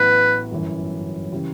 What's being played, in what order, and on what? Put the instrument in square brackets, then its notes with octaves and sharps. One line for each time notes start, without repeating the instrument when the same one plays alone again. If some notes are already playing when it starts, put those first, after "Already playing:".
Already playing: [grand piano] A1 A2 F#3 B3 F#4 [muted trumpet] B4
[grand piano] G1 F#2 E3
C#3 E3 G3